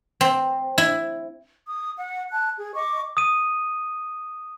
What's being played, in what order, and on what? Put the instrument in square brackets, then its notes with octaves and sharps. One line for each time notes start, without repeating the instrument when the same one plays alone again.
[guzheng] C4
E4
[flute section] D#6
F#5
A5 F#6
G#4
D#5 C#6 D6
[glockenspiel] D#6 D#7